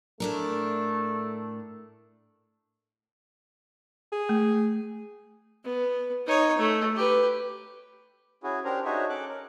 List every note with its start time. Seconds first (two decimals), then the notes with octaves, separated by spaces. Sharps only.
0.20 A2 A3 D4 A#4
4.12 G#4
4.29 A3
5.64 B3
6.26 D#4 C#5
6.58 A3
6.96 G4 B4
8.43 C#4 E4 F#4 G#4
8.65 C#4 D4 G4 A#4 C5 A#5
8.85 D4 D#4 F#4 G#4 C#5 E5
9.09 C#4 A4 D6 F#6
9.29 A#4